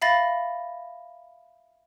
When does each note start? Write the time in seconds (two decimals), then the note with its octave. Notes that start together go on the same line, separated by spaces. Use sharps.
0.02 E5 F5 B5 A6 A#6